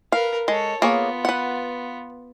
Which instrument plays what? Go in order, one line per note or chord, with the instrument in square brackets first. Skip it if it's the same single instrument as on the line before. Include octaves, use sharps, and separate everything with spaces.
[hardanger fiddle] A#4 B4 [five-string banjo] F5
[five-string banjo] G#3 [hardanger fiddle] A4 C#5
[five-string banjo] A#3 G#4 C#5 [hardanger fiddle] B3 F4
[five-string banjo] B4 F#5